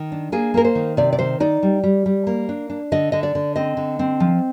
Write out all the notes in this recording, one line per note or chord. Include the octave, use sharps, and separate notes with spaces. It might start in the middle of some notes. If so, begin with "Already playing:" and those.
Already playing: D#3
D4
A#3 G#4
A#3 A#4
C5
D#3
C3 D5
D5
D#3 C5
D#4 D5
G3
G3
G3
A#3
D4
D4
D3 D#5
D3 D#5
D5
D3
C4 D#5
D3
C4
F3